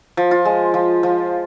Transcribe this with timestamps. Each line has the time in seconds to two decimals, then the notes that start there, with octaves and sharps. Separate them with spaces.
0.17 F3
0.31 F4
0.45 G#3
0.74 F3
1.03 F3